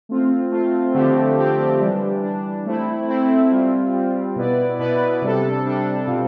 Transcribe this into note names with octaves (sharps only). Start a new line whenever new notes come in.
A3 C4 F4
A3 C4 F4
D3 F3 A3 C4 G4
D3 F3 A3 C4 G4
E3 G3 D4
E3 G3 D4
A3 C4 E4
A3 C4 E4
G3 C4 F4
G3 C4 F4
B2 B3 E4 B4 D5
B2 B3 E4 B4 D5
C3 G3 D4 A4
C3 G3 D4 A4
B2 G3 C4 F4 A4